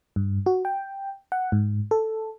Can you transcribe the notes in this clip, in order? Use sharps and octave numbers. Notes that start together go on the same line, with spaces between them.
G2
F#4
G5
F#5
G#2
A4